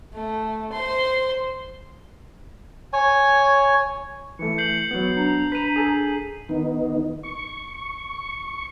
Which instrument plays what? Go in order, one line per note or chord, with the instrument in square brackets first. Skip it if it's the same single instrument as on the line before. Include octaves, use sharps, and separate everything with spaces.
[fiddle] A3
C5 C6
[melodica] C#5 G#5
[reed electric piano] E3 A3 [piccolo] C#7
[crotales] G6 C7 F#7
[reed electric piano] F#3 B3
[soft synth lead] D4 [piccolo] A#5
[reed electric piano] B4 [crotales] B6 D#7
[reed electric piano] G#4 A4 G#5
[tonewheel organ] D#3 B3 D#4
C#6